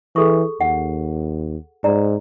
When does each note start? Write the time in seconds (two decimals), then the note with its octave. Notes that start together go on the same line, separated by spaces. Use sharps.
0.16 E3 G#4 A4 C#6
0.61 D#2 F#5
1.84 G#2 D5 A#5